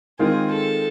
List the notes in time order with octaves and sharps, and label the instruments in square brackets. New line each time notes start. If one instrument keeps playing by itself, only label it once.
[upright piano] D#3 G#3 C4 F4 [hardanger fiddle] G#4
[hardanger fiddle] A4